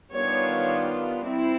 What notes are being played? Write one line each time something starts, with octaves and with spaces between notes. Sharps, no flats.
D#3 G3 B3 D4 F4 C#5
C4 E4